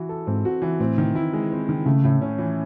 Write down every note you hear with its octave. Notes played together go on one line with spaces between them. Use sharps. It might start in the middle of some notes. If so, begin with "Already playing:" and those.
Already playing: E3 F#4
A4
G#2 C4
F#4
E3
A2 C4
D#3
E4
G#3
C4
D#3
C#3 A3
A2
C#4
E3